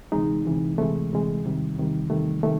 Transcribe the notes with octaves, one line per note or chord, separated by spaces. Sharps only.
D2 C3 E3 G#3 D#4
D2 C3 E3 G#3
D2 C3 E3 G#3 A3
D2 C3 E3 G#3
E2 C3 D#3 G3
E2 C3 D#3 G3
E2 C3 D#3 G3 A3
C3 D#3 G3 A3